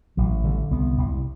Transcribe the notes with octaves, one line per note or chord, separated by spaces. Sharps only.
A1 F#3
D3 G3
C2 B3
C2